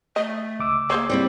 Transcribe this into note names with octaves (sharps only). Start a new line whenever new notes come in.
A3 D#5
C#2 D6 E6
A#3 G#4 C5 C#5
G3 C4 E4